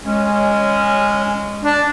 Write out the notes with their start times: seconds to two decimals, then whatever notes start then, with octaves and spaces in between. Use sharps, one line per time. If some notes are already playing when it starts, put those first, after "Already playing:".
0.05 G#3 C#4
1.64 D4